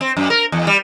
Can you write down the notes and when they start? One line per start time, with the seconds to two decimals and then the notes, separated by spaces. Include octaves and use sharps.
0.01 C4
0.17 F#2
0.30 A#4
0.52 E2
0.67 G3